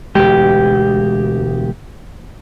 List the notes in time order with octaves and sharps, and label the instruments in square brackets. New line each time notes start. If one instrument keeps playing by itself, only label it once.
[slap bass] E1 D2 G#3 [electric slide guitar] G4